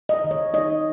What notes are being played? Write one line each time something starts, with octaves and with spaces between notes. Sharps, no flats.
D#5
D#3
C#5
D#4 D#5